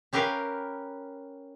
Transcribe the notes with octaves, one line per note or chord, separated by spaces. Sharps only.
C#4 G4 A#4 B4 F5